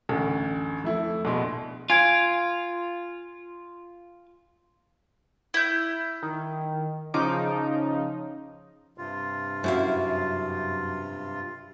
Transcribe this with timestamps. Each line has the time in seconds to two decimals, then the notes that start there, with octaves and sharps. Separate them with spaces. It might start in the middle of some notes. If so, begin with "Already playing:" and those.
0.09 A1 D2
0.84 F2 A3 E4
1.25 A#1 B2 C6
1.90 F4 G#5 G#6 D7
5.54 E4 G6
6.23 D#3
7.14 C#3 F3 D#4 D6
8.98 G2 C3 F4
9.64 F#2 E4 F5